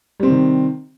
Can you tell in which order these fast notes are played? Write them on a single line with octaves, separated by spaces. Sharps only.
G3 C4 C3 D#3